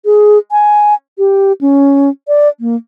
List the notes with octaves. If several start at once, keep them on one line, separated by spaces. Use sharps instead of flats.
G#4
G#5
G4
C#4
D5
A#3